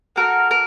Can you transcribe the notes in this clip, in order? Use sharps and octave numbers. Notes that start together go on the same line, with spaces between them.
A#3 F#4 A4 A#4
A#4